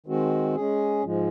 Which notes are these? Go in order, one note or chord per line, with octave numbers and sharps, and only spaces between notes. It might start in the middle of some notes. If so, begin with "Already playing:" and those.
D#3 G#3 C4 F#4
G#3 C#4 G#4
G#2 F3 G#3